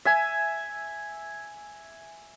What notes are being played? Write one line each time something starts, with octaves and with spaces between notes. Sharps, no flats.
E5 G#5